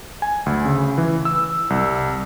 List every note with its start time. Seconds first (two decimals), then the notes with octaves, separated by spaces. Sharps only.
0.22 G#5
0.46 D2
0.65 C#3
0.98 E3
1.25 E6
1.70 C2